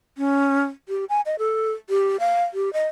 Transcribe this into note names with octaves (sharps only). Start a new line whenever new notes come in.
C#4
G4
G#5
D#5
A4
G4
F5
G4
D#5